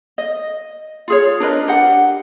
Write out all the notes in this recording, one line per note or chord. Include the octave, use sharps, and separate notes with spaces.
D#5
F4 G#4 C#5
D4 A#4 B4 D#5
D4 G4 F#5